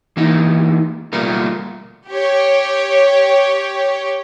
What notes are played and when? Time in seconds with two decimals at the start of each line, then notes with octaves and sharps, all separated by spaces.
0.17 E3 A#3 D#4
1.13 B2 G3 A3 A#3 F4 A#4
2.09 G4 C#5